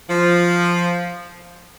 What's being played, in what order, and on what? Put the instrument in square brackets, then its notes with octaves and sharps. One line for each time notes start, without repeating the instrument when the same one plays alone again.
[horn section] F3